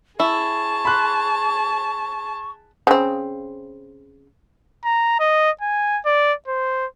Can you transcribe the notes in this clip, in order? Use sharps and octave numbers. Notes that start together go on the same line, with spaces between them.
E4 G#4 A5 C#6
B5 C6 F#6
C#3 C4
A#5
D#5
G#5
D5
C5